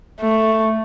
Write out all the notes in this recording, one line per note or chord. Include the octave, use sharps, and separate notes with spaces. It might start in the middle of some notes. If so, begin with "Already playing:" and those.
A3